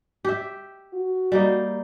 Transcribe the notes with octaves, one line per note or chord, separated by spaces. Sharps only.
G4 E5
F#4
G3 A#3 D#4